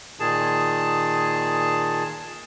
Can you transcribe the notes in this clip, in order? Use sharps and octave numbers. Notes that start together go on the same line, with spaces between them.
A#2 D#3 G#4 A5